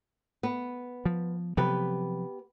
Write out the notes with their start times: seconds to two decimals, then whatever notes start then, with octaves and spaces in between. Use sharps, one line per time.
0.43 B3
1.05 F3
1.57 C3 F3 F#3 B3 G4 B4